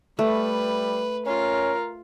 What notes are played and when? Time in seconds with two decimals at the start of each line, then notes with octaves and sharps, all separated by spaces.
0.19 G3 A3 B4
1.26 C#4 F4 A#4